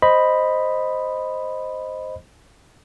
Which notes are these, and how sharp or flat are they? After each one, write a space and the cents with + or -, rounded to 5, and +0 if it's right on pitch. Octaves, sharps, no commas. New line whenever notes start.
C5 +0 D#5 +0 B5 +0